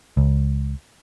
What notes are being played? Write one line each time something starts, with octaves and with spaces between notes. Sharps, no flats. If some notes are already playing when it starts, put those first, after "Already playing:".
C#2